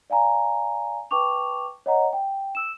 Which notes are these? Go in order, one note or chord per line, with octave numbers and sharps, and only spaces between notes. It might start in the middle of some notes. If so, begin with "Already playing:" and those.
D5 F5 G#5 A#5
B4 G5 A5 C#6 D6 F7
C#5 D#5 F#5 A#5
G5
E6 E7